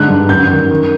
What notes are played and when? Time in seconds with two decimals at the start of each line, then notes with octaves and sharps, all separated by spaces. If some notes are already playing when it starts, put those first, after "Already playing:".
Already playing: G#2 D3 F#6
0.08 G2
0.28 F#2 G6
0.49 D#3
0.70 D#3